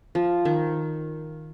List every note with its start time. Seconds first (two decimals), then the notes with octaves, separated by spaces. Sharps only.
0.15 F3
0.45 D#3